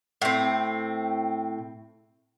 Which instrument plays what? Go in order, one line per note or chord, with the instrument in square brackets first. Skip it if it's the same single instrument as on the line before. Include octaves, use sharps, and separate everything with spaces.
[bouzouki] A2 C4